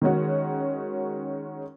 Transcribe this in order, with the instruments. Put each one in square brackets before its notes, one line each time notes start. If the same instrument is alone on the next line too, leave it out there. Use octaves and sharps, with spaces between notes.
[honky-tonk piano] D#3 G#3 C#4 F#4